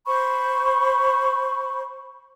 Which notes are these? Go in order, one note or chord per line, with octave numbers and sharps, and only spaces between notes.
C5 B5 C#6